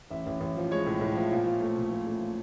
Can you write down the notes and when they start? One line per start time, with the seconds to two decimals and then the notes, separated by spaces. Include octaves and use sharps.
0.10 A1 E5
0.26 A1
0.40 A1
0.57 F3
0.71 G#3 C#5
0.86 A2
1.01 A2
1.15 F3
1.31 A#2
1.45 F3
1.61 A3
1.77 A#2
1.91 F3
2.07 A3
2.21 F3